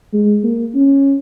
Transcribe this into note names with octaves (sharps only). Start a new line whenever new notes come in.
G#3
A#3
C#4